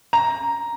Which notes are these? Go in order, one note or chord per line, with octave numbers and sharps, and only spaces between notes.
A#5